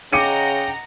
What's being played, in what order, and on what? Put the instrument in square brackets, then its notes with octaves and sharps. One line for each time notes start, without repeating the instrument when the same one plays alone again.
[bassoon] C#3 [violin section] D#5 F#5 A#5 [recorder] G5 [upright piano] D6 C#7 D#7